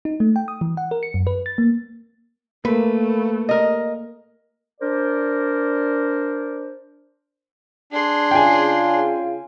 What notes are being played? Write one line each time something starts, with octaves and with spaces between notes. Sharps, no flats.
D#4
A3
G5
D#6
E3
F#5
A#4
C#7
F#2
B4
A6
A#3
A3 A#3 B4
A#4 D#5
D4 A#4 C5 D5
D4 G#4 C6
C#3 F4 G5 G#5